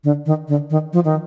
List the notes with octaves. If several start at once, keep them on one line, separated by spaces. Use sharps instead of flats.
D3
D#3
D3
D#3
F3
D#3